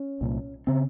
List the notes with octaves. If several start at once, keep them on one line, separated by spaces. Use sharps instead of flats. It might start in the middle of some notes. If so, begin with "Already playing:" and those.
Already playing: C#4
C2 A#2
C#3 C4